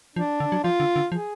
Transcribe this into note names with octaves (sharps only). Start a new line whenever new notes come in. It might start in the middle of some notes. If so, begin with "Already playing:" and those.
F3 D4
D3
F#3
F3 F4
D3
D3
F3 G#4